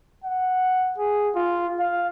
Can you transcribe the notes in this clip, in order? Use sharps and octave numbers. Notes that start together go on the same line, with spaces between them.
F#5
G#4
F4
F5